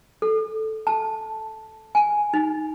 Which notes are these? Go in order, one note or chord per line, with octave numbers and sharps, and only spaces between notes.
A4
A5
G#5
D#4